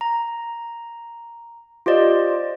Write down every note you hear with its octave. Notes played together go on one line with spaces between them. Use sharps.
A#5
F4 G4 C5 D5 D#5